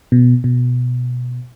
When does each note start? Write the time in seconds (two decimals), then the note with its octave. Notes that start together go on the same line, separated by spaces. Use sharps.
0.12 B2
0.44 B2